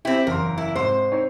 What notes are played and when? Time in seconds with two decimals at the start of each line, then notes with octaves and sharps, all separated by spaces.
0.05 C4 E4 G4
0.27 F#1 E2 A#4 C6
0.58 E4
0.75 G#2 C3 C5
1.12 C4 D#4 C#5